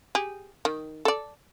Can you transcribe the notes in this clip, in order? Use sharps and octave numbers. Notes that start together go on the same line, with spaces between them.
G4 G#4
D#3
A4 D5